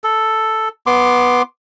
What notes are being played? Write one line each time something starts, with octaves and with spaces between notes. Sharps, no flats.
A4
B3 C6 D6